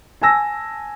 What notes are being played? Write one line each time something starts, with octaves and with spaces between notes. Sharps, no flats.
G#5 A5 E6 A#6